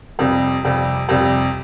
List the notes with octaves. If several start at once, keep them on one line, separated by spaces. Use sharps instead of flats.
F2 C3 G3
F2 C3 G3
F2 C3 G3